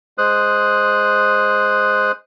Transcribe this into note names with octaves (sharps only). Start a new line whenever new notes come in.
G#3 C5 D#6 F#6